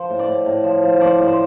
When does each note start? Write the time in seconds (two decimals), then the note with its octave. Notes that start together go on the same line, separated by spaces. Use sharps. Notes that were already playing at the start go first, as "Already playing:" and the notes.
Already playing: F3 C5
0.10 A2
0.19 D5
0.28 A2
0.46 A2
0.64 F3
0.83 F3
1.01 F3 D5
1.19 A2
1.27 C5